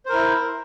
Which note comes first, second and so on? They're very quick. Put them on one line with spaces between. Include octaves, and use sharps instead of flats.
C5 A#4 E4